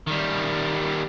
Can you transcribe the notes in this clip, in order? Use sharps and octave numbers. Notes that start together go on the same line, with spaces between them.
D#3 G3